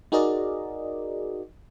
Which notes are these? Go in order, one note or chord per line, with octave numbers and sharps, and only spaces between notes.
D#4 F#4 G#4 A#4 D5 D#5